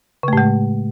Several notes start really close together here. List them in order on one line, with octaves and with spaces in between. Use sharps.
C#3 A3 A2 G#3